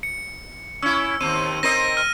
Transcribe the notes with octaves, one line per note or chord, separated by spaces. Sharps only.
C#7
C#4 E4 E6
D#2 C4 D#7
C4 A#4 D#5 A#6 D#7
F6 D#7